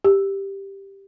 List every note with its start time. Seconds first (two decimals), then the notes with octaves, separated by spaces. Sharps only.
0.05 G4